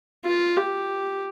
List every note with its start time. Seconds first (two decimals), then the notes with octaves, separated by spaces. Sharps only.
0.25 F4
0.56 G4